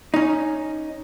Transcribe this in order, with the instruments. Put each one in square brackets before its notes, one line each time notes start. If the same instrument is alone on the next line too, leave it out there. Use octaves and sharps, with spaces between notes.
[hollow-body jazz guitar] C#4 D#4